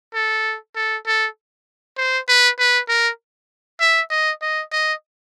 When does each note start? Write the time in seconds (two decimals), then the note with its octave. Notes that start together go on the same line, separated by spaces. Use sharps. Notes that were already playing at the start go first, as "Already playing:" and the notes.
0.14 A4
0.76 A4
1.06 A4
1.97 C5
2.28 B4
2.59 B4
2.89 A#4
3.80 E5
4.10 D#5
4.41 D#5
4.72 D#5